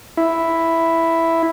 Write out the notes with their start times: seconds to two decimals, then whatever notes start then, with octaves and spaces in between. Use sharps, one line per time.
0.17 E4